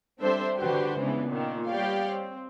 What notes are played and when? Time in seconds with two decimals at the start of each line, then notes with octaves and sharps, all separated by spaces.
0.20 G3 C4 D4 A4 C5 E5
0.57 D3 D4 F#4 G4 B4 C5
0.98 G#2 C#3 E3 B3 D4
1.28 A#2 D#3
1.68 G3 B3 G4 C#5 D5 F5
2.11 C4